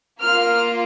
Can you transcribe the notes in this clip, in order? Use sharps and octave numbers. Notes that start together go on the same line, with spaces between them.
A#3 F4 F6